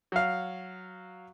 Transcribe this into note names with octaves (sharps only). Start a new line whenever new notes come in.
F#3 F5